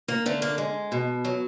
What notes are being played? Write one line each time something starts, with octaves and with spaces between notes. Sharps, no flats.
A#3
D3 A3
A#3
G#3
B2
F#3